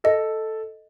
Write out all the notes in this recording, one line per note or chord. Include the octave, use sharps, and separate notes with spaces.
A4 D#5